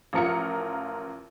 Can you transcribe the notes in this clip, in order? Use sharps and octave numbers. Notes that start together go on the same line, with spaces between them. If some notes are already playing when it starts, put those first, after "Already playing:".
A1 F3 F4 A#4 C#7